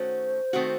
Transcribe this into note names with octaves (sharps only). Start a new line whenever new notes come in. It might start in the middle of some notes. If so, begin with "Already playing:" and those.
Already playing: D#3 A3 C#4 F#4 C5
D#3 A3 C4 F#4